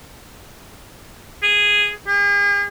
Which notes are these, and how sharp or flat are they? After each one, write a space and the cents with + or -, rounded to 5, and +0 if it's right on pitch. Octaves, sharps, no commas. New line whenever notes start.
G#4 -5
G#4 -45